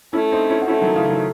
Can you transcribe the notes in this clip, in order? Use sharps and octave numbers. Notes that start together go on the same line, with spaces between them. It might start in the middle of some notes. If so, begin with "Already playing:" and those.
A3 C#4 E4
C4 D#4
C#4 E4
F#4
A3 C#4 E4
D#3 F#3
C#3 E3
D#3 F#3